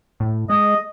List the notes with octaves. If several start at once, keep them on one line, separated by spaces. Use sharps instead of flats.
A2
G#3 D#5